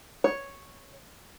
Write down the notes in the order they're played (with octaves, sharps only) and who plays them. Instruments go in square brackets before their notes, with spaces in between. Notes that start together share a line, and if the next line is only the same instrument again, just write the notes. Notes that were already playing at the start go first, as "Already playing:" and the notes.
[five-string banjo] C#5